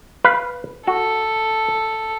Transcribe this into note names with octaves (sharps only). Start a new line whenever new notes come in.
B4 F5
F#4 A4